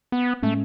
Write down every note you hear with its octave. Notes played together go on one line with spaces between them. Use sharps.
B3
A2 G#3 A3 C#4